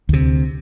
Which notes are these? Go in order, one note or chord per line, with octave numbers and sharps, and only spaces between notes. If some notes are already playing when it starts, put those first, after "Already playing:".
D2 C3